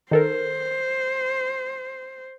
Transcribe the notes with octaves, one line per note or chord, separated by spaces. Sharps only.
D#3 A4 A#4 C5